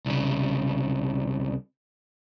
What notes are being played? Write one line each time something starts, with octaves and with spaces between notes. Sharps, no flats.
C2 C#3